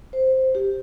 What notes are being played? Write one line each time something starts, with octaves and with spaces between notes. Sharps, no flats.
C5
G4